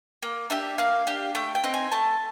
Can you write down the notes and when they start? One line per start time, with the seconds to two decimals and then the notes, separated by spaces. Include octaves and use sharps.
0.22 A#3
0.50 D4 G4 E5
0.78 A#3 F5
1.07 D4 G4
1.35 A3 G5
1.55 G5
1.64 C4 D#4
1.74 G#5
1.92 A3 A5